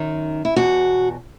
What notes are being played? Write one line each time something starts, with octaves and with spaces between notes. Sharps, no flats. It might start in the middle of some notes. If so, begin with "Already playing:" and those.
Already playing: F#2 D#3
E4
E2 B2 F#4